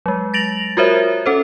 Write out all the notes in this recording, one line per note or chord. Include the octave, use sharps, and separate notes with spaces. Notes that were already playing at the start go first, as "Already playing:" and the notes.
F#3 G#3
A6 A#6 D7 F7 F#7
F4 F#4 A#4 C5 C#5 E5
C#4 A4 C5